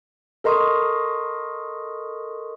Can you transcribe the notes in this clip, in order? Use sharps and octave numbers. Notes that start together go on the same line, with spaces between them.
A4 A#4 D#5 C6 C#6 D#6